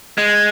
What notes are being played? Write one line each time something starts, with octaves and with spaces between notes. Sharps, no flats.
G#3